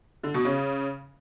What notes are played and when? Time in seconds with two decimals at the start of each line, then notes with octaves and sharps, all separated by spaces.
0.24 D3
0.34 B2
0.45 C#3